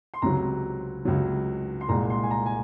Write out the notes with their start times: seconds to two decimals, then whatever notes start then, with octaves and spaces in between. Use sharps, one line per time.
0.14 C6
0.22 C#2 C3 F#3 A#5
1.05 C#2 C3 F#3
1.81 C6
1.89 C2 A#2 G#3 A#5
2.10 C6
2.23 G#5
2.31 A#5
2.46 G#5